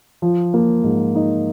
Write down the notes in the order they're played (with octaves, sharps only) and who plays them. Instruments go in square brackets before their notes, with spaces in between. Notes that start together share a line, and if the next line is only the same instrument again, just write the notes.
[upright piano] F3
A#3
G#2
D#4